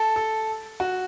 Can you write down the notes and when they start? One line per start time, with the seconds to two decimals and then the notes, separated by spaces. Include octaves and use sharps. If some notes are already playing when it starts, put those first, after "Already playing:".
Already playing: A4
0.16 A4
0.80 F#4